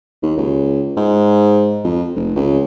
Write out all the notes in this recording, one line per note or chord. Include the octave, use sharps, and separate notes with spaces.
D#2
C#2
G#2
F2
F1
C#2